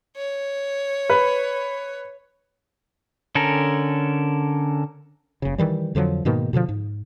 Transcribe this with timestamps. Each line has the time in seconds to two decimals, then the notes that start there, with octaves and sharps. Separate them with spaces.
0.16 C#5
1.10 B4
3.35 D3 C#4 A4 A#4
5.42 F#1 C#3
5.58 D#3 E3 G3
5.95 F2 D3 F3 F#3
6.25 G#2 B2 D#3 A#3
6.53 B2 D3 D#3 F3
6.69 G#2